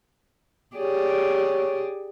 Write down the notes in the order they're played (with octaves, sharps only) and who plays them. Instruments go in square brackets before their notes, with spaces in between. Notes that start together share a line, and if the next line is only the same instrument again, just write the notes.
[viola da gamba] G4 G#4 D5 [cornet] C#5